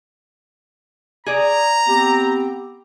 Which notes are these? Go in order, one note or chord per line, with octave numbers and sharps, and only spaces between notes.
G#4 D5 A#5
B3 C4 G4